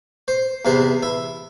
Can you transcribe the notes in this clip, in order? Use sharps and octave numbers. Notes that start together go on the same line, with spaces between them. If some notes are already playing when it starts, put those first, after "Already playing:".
C5
E2 C3 E3 C5
E4